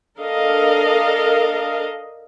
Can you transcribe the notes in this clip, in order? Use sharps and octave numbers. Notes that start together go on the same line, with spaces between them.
D4 A4 A#4 D#5 F5